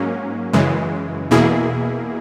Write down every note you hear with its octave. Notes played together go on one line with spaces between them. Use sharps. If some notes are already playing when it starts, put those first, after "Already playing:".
Already playing: G#2 F#3 A#3 C#4
F#2 C#3 E3 G#3
E2 B2 A#3 E4 G#4